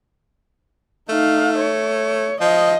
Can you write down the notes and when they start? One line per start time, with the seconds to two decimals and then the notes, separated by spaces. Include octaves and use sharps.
1.09 A3 D#4 F5
1.58 C#5
2.41 F3 D#5